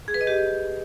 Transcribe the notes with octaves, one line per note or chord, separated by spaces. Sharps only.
G#4
B4
D#5
G4